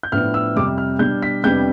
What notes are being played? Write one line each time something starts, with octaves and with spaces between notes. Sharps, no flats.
G6
A2 F3 B3 D4 F6
E6
F2 C3 G3 D6
F6
B2 G3 D4 G6
B6
F2 C3 G3 B3 D4 G6